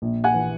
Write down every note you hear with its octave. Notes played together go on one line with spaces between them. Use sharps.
A#1
F#5 G#5
E3